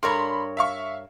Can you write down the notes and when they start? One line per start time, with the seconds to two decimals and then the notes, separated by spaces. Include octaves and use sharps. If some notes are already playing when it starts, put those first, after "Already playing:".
0.03 G2 A#4 C#5 B5 C6
0.57 E5 F5 C#6